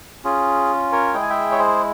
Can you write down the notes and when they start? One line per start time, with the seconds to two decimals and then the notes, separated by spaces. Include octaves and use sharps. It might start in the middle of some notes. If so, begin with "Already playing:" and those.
0.25 C#4 F4 G#4
0.92 A#4 C#5
1.14 G#3 E4 G#4 G5
1.22 G#5
1.30 E5 G5
1.52 C#5
1.58 G#4 C5